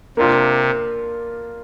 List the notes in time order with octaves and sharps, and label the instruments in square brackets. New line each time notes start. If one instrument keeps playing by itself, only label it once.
[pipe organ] C3 [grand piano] A#3 D4 F4